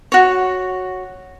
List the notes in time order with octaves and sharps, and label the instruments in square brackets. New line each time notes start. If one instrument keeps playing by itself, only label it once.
[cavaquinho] F#4 C#5